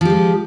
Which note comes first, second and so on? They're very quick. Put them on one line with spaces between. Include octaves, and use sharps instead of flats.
F3 G4 G#3